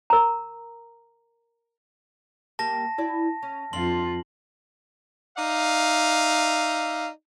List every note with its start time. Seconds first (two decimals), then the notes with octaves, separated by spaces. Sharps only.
0.10 A#4 A#5
2.59 G3 A#3 G4 A5 A#6
2.98 E4 F#4 D5
3.43 C#4
3.73 F2 D4 F4 C6 F#7
5.36 D#4 D5 E5 F5